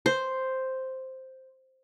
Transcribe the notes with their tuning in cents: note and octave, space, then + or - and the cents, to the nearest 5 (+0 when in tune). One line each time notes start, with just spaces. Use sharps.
C5 +0